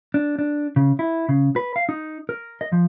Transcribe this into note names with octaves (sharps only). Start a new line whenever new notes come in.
D4
D4
C#3
E4
C#3
B4
F5
D#4
A#4
D#5
F3